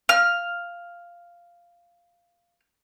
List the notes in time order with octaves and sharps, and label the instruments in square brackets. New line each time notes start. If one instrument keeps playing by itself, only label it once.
[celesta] F5 [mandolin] F6